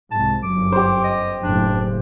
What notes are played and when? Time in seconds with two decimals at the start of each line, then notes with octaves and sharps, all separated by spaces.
0.11 C2 G#2 A5
0.43 G1 F#2 D6
0.72 G4 C5
1.04 D#5
1.43 F#1 A2 D4